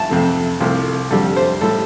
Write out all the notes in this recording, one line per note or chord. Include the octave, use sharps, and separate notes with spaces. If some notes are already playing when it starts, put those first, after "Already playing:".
Already playing: A5
F2 C3 A3
C2 C3 F3 A3
F2 D3 G3 A4
C5
A2 G3 A4